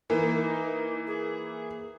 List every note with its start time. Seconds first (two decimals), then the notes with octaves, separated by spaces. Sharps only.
0.10 E3 A#3 D#4
1.07 G#4